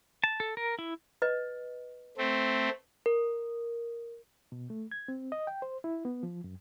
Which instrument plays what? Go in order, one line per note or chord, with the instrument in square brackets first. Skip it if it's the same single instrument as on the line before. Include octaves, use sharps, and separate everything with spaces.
[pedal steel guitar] A5
A4
A#4
E4
[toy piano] B4 D#5
[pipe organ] A3 C4
[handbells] A#4
[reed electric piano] B2
A3
G#6
C4
D#5
G5
C5
E4
B3
F3
F#2